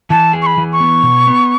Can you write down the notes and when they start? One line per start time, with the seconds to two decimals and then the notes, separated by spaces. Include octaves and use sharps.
0.10 E3 A5
0.33 G#4
0.42 C#6
0.46 B5
0.58 E3
0.73 C#6
0.80 B3
1.03 B2
1.27 B3